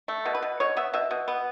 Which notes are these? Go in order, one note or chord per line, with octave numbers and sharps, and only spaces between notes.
A3
B2
B4
B2
B2 C#5
B3 E5
B2 E5
B2
B3